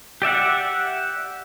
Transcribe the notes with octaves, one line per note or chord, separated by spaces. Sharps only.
G4 D5 E5 F#5